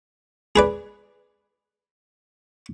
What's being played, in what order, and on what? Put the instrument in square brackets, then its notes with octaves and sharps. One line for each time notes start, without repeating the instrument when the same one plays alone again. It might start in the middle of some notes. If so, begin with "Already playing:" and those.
[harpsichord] G#4 B4 D5